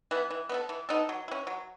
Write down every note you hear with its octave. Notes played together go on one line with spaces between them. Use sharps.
E3 B3
E3
B3 D#4 A4
E3
B3 D#4 A4
F#3
C#4 E4
F#3